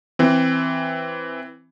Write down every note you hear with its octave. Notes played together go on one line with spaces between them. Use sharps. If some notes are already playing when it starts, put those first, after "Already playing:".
E3 C4